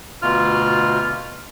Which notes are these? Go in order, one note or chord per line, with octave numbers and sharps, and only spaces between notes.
D2 B2 F4 F6